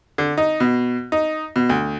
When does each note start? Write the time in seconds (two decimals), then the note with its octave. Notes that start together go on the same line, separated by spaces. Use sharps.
0.18 D3
0.38 D#4
0.60 B2
1.12 D#4
1.56 B2
1.69 D2